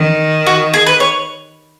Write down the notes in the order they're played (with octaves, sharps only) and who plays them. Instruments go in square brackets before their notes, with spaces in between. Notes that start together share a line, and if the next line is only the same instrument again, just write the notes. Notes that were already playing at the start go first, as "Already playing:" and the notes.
Already playing: [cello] D#3
[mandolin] F#4
G#4
B4
C#5